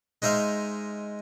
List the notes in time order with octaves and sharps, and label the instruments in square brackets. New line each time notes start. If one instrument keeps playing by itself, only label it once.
[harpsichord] G#3 D#4 C5 E5 F5